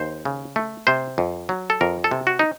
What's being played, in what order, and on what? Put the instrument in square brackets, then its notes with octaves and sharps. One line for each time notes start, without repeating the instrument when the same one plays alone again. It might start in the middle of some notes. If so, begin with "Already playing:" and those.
Already playing: [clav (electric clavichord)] D#2 C5
C#3
A3
C3 C5
F2
F#3
A4
F2 A#4
A4
C3
F#4
D#4